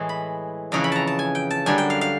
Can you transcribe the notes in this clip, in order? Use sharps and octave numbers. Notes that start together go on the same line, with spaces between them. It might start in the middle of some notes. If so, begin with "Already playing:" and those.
Already playing: A2 E3 G#3
B5
F2 C#3 E3 A#5
B5
A5 A#5
A5
G#5
G5
A5
F#2 D3 G3 G#5
G5
F5
F5